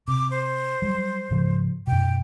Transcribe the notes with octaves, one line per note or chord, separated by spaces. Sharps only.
C3 D6
C5
F#3 G3
G#2 C#3 F3
F#2 B2 G5